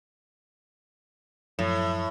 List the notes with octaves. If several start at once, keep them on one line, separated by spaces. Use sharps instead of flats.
F#2 A2 F3 F#3